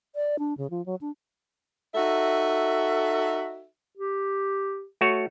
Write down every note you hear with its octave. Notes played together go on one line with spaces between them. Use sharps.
D5
D4
C#3
F3
F#3
D4
D#4 F#4 A4 E5
G4
A3 F#4 C#5